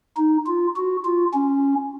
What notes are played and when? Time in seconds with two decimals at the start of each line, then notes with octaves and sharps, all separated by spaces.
0.17 D#4
0.46 F4
0.76 F#4
1.05 F4
1.34 C#4